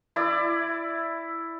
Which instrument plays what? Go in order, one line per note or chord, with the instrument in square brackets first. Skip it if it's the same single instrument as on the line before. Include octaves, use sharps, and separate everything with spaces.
[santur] E4 D5